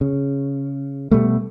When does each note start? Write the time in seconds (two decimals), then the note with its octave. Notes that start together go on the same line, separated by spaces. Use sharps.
0.01 C#3
1.11 B2 G3 A3